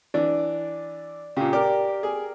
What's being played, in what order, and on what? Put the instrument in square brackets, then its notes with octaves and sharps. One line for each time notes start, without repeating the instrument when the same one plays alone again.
[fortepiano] E3 D4 [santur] D5
[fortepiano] A#2 C#3 [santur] G4
[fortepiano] G4 [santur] A#4 D5
[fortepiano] G#4